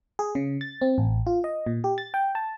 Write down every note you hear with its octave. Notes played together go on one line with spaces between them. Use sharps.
G#4
C#3
A6
C4
A1
F4
D#5
A#2
G4
A6
G5
A5